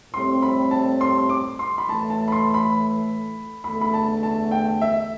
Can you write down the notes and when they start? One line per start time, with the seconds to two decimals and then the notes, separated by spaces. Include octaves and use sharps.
0.13 A2 G3 C4 G4 C6
0.42 B5
0.71 A5
1.01 C6
1.29 D6
1.59 C6
1.78 B5
1.88 A2 E3 A3 A5
2.10 A5
2.28 B5
2.32 C6
2.54 B5
3.64 E2 D3 A3 B5
3.81 B5
3.94 A5
4.23 A5
4.51 G5
4.81 E5